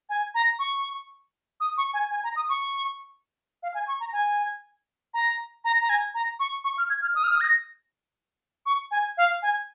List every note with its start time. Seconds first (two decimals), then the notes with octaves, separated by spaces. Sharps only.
0.09 G#5
0.35 A#5
0.59 C#6
1.60 D#6
1.78 C#6
1.94 G#5
2.11 G#5
2.24 A#5
2.36 D#6
2.49 C#6
3.63 F5
3.74 G#5
3.88 C#6
4.00 A#5
4.13 G#5
5.14 A#5
5.65 A#5
5.82 A#5
5.89 G#5
6.14 A#5
6.40 C#6
6.64 C#6
6.78 F6
6.90 G#6
7.02 F6
7.15 D#6
7.24 F6
7.32 D#6
7.40 A#6
8.66 C#6
8.91 G#5
9.17 F5
9.42 G#5